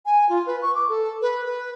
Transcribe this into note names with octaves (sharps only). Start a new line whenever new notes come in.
G#5
F4
B4
C#6
D6
A4
B4
B4